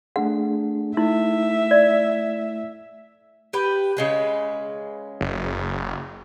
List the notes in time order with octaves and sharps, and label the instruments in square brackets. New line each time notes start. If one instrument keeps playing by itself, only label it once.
[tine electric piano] A3 D4 G#4 [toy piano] F#5
[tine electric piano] A3 E4 [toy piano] D#4 [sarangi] E5
[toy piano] D5
[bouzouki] G4 B4 G5
C#3 G#3 B4
[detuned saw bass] F#1